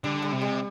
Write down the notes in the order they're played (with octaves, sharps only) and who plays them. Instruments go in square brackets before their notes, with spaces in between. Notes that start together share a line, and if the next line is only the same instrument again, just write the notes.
[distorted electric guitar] D3 [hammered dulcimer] G3
[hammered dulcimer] G3
[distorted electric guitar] C3
[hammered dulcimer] G3